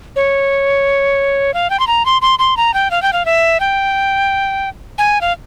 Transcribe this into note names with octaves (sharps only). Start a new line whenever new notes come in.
C#5
F5
G5
C6
A#5
C6
C6
C6
A#5
G5
F5
G5
F5
E5
G5
G#5
F5